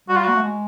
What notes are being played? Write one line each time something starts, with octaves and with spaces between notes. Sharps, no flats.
G3 F#4
F4
A#3 F#4
A3
G#3